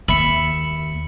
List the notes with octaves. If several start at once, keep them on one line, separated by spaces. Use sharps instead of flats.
D#2 E5 B5 C#7 F#7